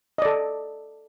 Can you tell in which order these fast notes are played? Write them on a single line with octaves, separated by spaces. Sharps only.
D#5 D5 A4